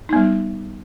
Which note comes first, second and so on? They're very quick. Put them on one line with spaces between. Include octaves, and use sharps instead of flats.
D#4 B3 G3